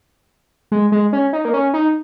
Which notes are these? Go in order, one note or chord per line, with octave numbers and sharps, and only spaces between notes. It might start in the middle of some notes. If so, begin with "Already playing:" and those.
G#3
G#3
C#4
D#4
A#3
C#4
D#4